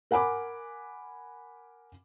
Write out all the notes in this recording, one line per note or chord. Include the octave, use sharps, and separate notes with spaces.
A#4 F#5 G#5 B5 D6